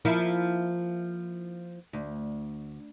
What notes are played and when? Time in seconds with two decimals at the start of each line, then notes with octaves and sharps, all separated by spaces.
0.05 F3 A#3 E4
1.93 D2